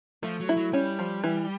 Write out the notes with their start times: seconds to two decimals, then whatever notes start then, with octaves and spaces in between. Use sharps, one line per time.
0.23 F3 A3
0.40 F#3
0.49 E4
0.56 F#3
0.73 G3 C#4
0.99 F3
1.24 E3